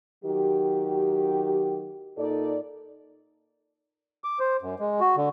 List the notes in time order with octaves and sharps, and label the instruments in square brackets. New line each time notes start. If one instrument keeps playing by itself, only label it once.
[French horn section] D#3 F#3 G4
A#2 D#4 A4 D5
[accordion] D6
C5
F#2
G#3
F#4
D3